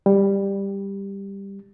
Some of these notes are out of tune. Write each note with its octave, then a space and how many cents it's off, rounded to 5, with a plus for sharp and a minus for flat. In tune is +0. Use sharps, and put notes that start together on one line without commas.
G3 +10